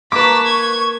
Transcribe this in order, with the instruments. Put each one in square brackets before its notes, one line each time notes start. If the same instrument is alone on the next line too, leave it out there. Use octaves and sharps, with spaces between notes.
[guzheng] A#3 [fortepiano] B4 D6 [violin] A5 B6 [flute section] C#6
[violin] G#6